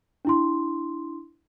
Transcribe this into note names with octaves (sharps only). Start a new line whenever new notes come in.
D4 E4 C6